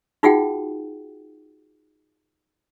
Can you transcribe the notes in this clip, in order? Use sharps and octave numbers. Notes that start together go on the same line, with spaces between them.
D#4 F4 F#4 G#4 F#5 G5